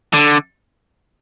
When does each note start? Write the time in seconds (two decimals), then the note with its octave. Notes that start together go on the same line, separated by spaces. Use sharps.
0.14 D3